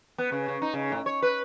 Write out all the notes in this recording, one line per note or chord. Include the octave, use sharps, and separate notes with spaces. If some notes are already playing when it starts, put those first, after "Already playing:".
B3
C#3
C#3
D#4
C#3
A2
C#5
B4